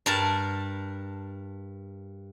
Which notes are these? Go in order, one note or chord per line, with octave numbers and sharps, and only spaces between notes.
G2 A#4 A5